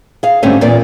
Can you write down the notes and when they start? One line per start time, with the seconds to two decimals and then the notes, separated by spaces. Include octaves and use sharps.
0.23 G#4 F5
0.43 G#2 D3 G3 A3 C4 C#4
0.61 E2 A#2 A#3 D5